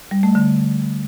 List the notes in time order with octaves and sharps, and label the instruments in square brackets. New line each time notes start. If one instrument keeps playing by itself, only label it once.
[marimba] G3
A3
D3